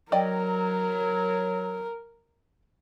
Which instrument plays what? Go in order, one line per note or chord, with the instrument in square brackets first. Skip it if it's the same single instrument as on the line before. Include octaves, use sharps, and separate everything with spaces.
[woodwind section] F#3 [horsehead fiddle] A#4 [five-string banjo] D5 D#5 G5